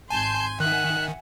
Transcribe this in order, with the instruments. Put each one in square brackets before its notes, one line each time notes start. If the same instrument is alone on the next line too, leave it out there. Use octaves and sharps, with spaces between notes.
[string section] G#1 C6 G6 [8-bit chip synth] G#5 [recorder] A5
[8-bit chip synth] D#3 [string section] E5 F#5 G#5 [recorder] F#6